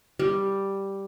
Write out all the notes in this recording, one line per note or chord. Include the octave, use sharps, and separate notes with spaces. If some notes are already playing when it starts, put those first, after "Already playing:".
G3